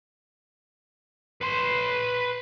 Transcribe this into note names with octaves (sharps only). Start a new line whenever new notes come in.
B4 C6